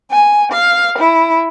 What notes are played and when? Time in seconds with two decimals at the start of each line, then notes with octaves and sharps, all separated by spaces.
0.11 G#5
0.51 F5
0.98 E4